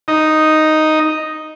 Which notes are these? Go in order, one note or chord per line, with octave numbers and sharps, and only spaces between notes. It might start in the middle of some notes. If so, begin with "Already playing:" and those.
D#4